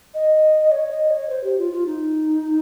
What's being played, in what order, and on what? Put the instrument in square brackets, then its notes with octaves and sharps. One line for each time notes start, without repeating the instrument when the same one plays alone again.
[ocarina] D#5
C#5
D#5
C#5
C5
G4
F4
F4
D#4